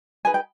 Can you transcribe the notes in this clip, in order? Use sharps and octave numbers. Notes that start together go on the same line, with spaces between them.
D#4 G#4 B4 G#5
G5